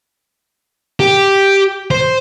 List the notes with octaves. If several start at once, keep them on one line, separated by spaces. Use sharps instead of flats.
G4
C5